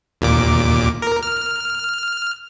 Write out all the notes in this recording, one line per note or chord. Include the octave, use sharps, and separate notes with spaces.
D#2 A#2 D6
A#4
F6